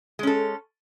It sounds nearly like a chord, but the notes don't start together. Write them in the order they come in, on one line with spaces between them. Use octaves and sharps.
G#3 C#4 A4